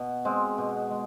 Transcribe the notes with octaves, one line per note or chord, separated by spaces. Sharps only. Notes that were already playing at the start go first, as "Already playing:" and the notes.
Already playing: B2
G#3 C4
B2
G#3